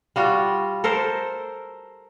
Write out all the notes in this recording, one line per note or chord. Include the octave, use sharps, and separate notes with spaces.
G3 F4 F#4
A4 A#4 C5